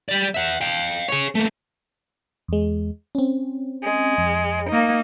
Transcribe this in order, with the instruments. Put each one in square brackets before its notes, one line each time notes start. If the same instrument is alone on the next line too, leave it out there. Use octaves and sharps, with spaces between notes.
[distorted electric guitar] G3 D5
E5 F#5
F5 G5
G#4 C#5
A3 A#3
[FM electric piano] E2 G#3
C4 C#4
[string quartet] G#3
[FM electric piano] F2
[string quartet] A#3 D#4